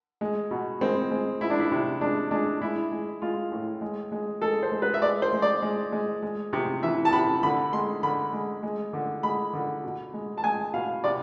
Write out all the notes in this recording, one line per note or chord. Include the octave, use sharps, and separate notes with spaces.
G#3
B2
G#3 C4
G#3
G#3 E4
D4
E4
C3
G#3 D4
G#3 D4
G#3 E4
G#3
G#3 F4
A2
G#3
G#3
G#3 A4
C5
G#3
B4
E5
G#3 D5
C5
G#3
D5
G#3
G#3
G#3
C3
E3 E5
A5
C3 B5
D3 B5
G#3 C6
D3 B5
G#3
G#3
D3
G#3 B5
D3
B2
G#3
A5
G#3 G#5
B2 F5
C3 D5